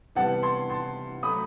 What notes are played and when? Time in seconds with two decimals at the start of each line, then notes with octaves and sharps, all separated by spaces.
0.15 C3 E3 G3 B3 F#5 A5
0.42 A5 C6
0.70 A5 C6
1.23 F#3 A3 B5 D#6